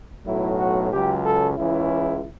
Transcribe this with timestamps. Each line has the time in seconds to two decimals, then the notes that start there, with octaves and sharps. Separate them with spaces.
0.25 B1 A2 F#3 E4
0.58 F#4
0.91 C#2 C#3 F#3 G4
1.25 A4
1.57 C#2 C#3 E3 E4